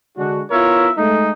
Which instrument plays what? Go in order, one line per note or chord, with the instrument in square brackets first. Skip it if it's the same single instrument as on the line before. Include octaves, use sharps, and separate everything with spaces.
[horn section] D3 G#3 D4 F#4
B3 E4 F4 A#4 C#5 E5
G#3 A3 D#4